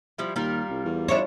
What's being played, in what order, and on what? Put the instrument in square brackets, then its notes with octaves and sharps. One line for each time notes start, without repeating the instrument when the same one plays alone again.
[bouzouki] F3 G3 E4
[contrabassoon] D#2 [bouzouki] G3 F4 A#4
[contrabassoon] C2
E2
[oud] D4 E4 C#5